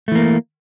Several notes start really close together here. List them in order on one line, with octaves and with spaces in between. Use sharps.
A3 E3 A#3